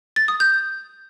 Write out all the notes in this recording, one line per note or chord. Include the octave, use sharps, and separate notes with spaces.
A6
D#6
G6